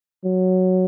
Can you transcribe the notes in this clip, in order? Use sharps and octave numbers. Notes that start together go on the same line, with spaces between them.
F#3